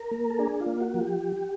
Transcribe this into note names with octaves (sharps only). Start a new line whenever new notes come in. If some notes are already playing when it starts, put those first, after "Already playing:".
Already playing: A#4
A#3
A4
D4 G#4
F4
A#3
F#4
F3
G4